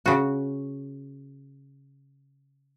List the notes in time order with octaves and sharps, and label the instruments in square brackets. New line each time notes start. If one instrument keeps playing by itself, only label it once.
[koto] C#3 F#4